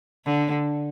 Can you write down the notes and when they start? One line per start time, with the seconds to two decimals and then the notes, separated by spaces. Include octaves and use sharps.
0.25 D3